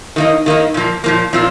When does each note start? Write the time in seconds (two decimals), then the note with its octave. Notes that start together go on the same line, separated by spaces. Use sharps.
0.16 D#3 A#3 D#4
0.46 D#3 A#3 D#4
0.74 A#2 F3 A#3
1.04 A#2 F3 A#3
1.33 A#2 F3 C4 F4